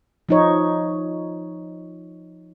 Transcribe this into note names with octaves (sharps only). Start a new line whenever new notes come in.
F3 D#4 C#5